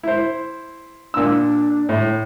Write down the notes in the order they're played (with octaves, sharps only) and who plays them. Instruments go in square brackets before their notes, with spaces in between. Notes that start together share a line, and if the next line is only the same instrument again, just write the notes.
[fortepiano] E4 C5
[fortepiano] A#2 E6 [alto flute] D4
[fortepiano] A2